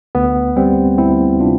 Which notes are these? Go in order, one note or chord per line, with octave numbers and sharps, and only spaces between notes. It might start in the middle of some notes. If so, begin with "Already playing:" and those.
D2 B3
G3 C4
D2 C4 E4
C3 D4 F4